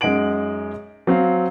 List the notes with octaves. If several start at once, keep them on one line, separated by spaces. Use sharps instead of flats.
F#2 G#3 D#4 F#5 D7 F#7
F#3 C4 F5